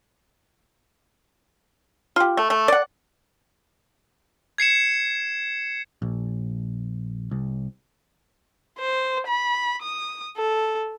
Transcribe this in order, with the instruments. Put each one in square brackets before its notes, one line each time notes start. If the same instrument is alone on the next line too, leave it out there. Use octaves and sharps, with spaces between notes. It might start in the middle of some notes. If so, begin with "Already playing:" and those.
[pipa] F4 G4
A3
A3
D5 F#5
[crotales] G#6 C7 C#7 E7
[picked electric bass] A#1
C2
[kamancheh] C5
B5
D#6
A4